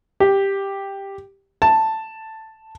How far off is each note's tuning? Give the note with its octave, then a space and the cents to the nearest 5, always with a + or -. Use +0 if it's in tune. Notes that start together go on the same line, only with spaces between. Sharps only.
G4 +5
A5 +5